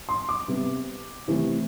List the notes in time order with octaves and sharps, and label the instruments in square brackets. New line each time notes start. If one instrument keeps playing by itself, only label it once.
[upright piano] C6
D6
C3 G3 B3
C3 E3 A3 C4